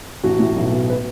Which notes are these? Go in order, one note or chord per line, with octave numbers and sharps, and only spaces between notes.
A1 F#4
A2
B1
B2
B4